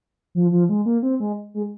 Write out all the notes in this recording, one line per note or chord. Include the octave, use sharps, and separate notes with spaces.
F3
F3
G#3
A#3
C4
G#3
G#3